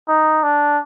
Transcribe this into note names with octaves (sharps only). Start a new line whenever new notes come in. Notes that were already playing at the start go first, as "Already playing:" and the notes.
D#4
D4